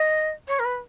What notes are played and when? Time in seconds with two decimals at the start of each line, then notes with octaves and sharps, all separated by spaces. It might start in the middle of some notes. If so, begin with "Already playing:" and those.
Already playing: D#5
0.48 C#5
0.59 A#4
0.65 B4